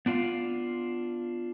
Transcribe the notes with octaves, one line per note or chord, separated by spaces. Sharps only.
B3 D4 F4 F5